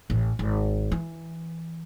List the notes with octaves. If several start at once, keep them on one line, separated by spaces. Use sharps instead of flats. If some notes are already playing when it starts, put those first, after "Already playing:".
A1
G#1
E3